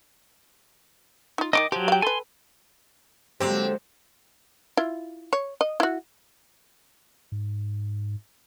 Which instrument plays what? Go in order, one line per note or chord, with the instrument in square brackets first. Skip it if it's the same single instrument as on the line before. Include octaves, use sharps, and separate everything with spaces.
[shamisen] D#4 F4
[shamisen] D#3 D4 D#4 [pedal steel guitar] D#5 D6
[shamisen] F3 [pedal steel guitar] F#3 G4
[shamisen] F5 G5
[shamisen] A4 B4 [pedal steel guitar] G#5 C6
[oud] D3 A#3 G4 [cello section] F#3 G#3 [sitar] C4
[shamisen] E4 F4
C#5
D#5
E4 F#4
[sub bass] G#2